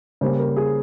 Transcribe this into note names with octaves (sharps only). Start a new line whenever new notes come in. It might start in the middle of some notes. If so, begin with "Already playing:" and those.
C#3 G3 A#3 C5
A#4
G#4